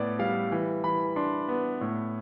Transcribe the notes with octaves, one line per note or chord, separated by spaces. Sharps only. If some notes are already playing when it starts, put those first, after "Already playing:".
Already playing: A2 B3 D5
G3 F5
E3
E3 B5
D4 C6
B3
A2